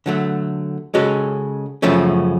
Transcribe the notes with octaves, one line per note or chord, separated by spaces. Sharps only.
D3 F#3 A3
C#3 G#3 C#4 F#4 A4
F#2 C#3 F3 A3 C#4